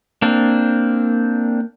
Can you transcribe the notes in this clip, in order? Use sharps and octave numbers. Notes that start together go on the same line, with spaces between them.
A#3 C4 D4